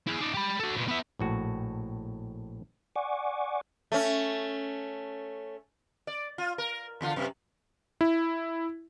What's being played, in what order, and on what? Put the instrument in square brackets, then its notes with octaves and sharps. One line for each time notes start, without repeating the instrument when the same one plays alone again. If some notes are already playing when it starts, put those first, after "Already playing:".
[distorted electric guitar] E4 G#4
D#4 D5
G4 B5
F#4 A4
A#2 B3
B3 E5
[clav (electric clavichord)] A#1 A2 F#4
[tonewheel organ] D5 F#5 G#5 C#6 D6
[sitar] A3 C#4
D5
F4
A#4
E2 D3 F4
F#2 C3
[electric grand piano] E4